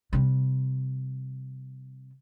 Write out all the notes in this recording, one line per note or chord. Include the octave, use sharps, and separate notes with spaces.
C3 G3